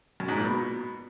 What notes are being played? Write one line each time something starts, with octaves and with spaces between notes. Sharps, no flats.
F#2
G#2
A#2
B2